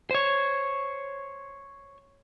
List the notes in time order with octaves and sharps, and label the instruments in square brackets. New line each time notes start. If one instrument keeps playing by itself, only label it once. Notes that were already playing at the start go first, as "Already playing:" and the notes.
[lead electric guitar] C5 C#5